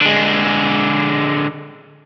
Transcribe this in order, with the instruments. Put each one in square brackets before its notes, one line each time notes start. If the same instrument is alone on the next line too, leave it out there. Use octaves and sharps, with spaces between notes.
[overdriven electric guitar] D3 G#3